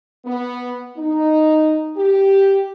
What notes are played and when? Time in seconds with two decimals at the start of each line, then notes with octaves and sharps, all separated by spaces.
0.25 B3
0.97 D#4
1.96 G4